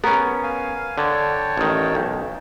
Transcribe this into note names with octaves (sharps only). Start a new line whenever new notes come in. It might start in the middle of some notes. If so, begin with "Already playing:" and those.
B3 C#4 A#4
F5 G#5
D3 C#5 G5 A5
A1 D#3
B1